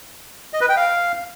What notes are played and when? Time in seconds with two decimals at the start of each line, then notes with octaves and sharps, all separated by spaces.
0.53 D#5
0.61 B4
0.69 G5
0.77 F5